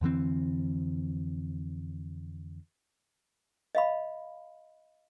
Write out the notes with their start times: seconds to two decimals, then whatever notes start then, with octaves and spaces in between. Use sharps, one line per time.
0.01 F2 D3 E3 C4
3.75 D#5 F5 B5